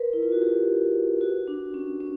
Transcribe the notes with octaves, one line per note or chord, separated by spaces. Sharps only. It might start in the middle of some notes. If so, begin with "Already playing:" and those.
Already playing: A#4 B4
E4
F4
F#4
G4
F#4
D4
C#4
C#4